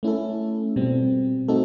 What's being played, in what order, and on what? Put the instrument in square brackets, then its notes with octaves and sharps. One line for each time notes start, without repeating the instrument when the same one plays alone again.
[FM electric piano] A3 C#4 E4 A4
B2 G3 C4
A3 C4 D#4 F#4 A4